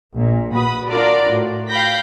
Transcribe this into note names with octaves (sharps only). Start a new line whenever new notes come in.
A#1 A#2
F#4 B4 B5 D#6
D4 F4 F#4 A#4 D5
A2
F5 G5 B5 G6 A#6 B6